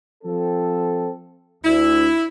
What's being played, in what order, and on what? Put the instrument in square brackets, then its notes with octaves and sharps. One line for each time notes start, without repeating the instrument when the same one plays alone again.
[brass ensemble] F3 C4 A4
[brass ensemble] D2 [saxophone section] E4